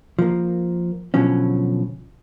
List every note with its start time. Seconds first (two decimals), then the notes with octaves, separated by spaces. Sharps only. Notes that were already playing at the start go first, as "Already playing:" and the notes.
0.19 F3 A#3
1.14 B2 D3 F3 F#3 C#4